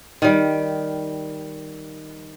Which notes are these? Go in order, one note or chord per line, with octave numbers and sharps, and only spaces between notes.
D#3 G3